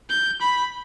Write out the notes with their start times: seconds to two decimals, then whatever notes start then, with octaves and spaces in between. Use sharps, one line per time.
0.09 G6
0.41 B5